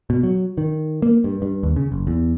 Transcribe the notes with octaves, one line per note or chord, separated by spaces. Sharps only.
B2
F#3
D#3
A#3
G2
G2
D#2
C#3
F#1
E2